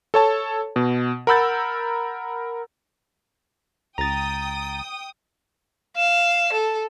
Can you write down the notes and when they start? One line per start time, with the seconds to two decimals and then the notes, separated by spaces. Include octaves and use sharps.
0.14 A4 C#5 A5
0.76 B2
1.27 A#4 F#5 B5 E6 G6 A6
3.98 C#2 G5 A#5 D#6 A6
5.97 F5 E7
6.53 A4